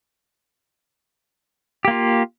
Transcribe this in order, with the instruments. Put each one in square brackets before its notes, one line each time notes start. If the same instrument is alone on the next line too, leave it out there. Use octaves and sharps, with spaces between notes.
[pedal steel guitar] G4
A#3
F4